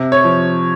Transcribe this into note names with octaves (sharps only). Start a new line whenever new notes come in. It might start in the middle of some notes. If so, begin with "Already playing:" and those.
Already playing: C3
C#5
F3